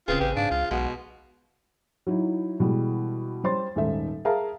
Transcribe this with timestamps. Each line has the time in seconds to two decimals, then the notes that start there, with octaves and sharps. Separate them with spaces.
0.08 D1 C#3 C4 F4 G#4 B4
0.20 A1 G4 B4
0.36 G#2 D4 F5
0.51 C#2 F4
0.71 B1 B2 G#3 F#5
2.07 F#3 D#4 E4
2.60 B2 E3 G3 G#3
3.44 G3 C#4 C5 C6 A6
3.76 D#1 G#2 D#4 A4 E5
4.25 G#4 A#4 E5 F5 A5 A#5